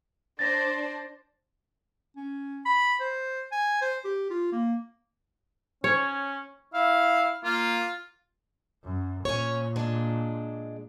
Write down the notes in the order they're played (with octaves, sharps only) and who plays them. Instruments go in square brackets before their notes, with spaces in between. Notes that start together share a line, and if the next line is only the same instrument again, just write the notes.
[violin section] D4 C5 D5 [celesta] A6 A#6
[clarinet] C#4
B5
C5
G#5
C5
G4
F4
A#3
[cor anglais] C#4 [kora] C#5
[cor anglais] E4 [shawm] F5
[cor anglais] A#3 [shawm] F4
[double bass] F#2
[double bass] A#2 [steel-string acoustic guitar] C#4 C#5
[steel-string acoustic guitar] G#3 D4